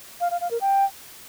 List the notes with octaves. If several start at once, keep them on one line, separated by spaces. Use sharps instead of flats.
F5
F5
F5
A#4
G5